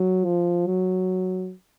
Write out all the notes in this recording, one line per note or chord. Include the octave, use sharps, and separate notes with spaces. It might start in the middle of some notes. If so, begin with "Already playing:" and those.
Already playing: F#3
F3
F#3